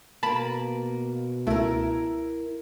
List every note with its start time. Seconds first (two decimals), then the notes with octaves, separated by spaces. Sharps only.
0.23 B2 A#3 A#4 A5 B5
1.47 C#2 A3 E4 A#4